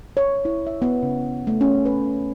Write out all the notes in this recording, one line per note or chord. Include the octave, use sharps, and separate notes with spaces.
C#5
E4
E5
B3
C#3
A3
C#4
B4